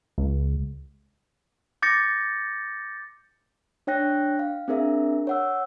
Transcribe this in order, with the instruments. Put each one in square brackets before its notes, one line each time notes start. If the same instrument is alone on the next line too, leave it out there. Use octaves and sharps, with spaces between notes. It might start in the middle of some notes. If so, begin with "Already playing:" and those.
[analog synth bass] C#2
[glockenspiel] D6 G6 A6 A#6 C#7
[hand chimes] D4 C#5 G5 F#6 A#6
F5
C4 D4 G#4 A#4 E5
C#5 F#5 E6